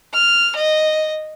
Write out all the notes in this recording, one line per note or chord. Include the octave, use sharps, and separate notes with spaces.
F6
D#5